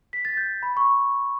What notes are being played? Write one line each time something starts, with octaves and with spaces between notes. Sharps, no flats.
B6
A6
G6
B5
C#6